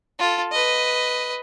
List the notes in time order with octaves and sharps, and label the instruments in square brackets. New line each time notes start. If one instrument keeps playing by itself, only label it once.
[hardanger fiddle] F4 A4
B4 D#5